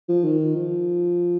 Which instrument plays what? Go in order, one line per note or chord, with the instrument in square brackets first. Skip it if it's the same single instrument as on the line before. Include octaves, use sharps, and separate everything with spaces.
[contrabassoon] F3
D#3
F3